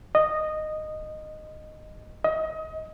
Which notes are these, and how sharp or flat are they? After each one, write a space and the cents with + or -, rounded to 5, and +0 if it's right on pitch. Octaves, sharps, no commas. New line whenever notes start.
D#5 -10
D#5 +30